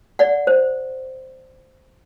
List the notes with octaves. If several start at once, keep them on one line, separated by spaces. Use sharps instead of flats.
D5 F#5
C5